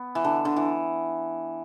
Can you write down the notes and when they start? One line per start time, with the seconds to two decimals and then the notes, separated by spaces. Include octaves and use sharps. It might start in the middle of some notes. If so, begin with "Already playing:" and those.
Already playing: B3
0.15 E3
0.24 D3
0.45 D3
0.56 E3